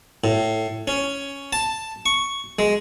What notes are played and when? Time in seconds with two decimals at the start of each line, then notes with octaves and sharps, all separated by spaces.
0.24 A2
0.88 C#4
1.53 A5
2.06 C#6
2.59 G#3